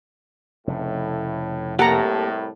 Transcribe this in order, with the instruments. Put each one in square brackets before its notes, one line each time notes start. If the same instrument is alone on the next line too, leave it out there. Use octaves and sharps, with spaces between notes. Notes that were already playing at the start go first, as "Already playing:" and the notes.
[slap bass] F1 C#3 [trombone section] A2
[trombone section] C2 A2 [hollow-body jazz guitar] A#3 G4 A4 [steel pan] F#5 A#5